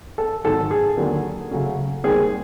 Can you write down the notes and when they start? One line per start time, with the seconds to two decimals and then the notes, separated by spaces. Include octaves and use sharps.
0.18 A4
0.44 G#2 D#3 F#3 A4
0.71 G#4
0.97 D#2 D3 F#3
1.51 C#3 F#3 A3 C#4
2.04 D#2 D#3 G3 C4 G#4